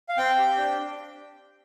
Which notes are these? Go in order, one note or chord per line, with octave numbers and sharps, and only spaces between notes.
F5
C4 G5
G4
D4